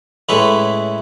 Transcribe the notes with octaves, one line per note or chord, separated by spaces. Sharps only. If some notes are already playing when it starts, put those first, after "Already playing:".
A2 G#3 C#4 E4 B4